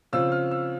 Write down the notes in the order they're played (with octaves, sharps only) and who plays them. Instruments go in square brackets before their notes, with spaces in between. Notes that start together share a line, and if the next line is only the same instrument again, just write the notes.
[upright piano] C#3 F3 C4 F4 E6
F6
E6